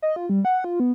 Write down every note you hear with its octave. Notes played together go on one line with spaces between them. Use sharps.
D#5
F4
G3
F#5
F4
B3